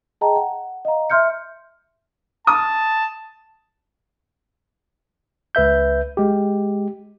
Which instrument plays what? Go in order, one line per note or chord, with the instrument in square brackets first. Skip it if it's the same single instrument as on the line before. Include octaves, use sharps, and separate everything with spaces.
[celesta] G#4 D#5 G5 A5 A#5
F#5
D#5 F5 A#5
E5 C6 F6 G6 C#7
[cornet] A5 [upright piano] D#6
[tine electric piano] C#2 B4 E5 G6
G#3 G4